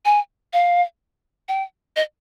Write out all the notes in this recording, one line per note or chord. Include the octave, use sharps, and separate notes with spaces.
G#5
F5
G5
D#5